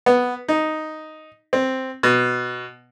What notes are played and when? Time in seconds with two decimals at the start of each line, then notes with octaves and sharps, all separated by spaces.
0.06 B3
0.48 D#4
1.53 C4
2.03 B2